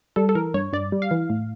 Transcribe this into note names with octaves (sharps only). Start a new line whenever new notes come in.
G3 A4
A4
E3 A#4
G2 C#5
G2 D5
G3
F5
E3
A2